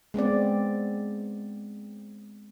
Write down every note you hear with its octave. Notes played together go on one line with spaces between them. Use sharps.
G#3 B3 C4 D5